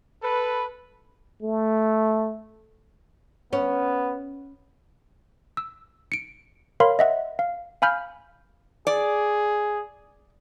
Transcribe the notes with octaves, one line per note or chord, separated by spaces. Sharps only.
A4 B4
A3
B3 C#4
E6
C#7 D7
A#4 C#5 F5 B5 C6
D#5 E5 F#5
F5
F5 G#5 B5 F6 G6
G#4 D5